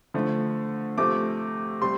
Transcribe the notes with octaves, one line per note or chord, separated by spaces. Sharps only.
D3 F3 A3
C3 F3 A3 D6
C3 G3 C6